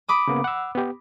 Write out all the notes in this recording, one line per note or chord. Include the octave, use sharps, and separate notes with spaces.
B5 D6 D#6
C#3 A#3 B3
F#5 E6
B3 G4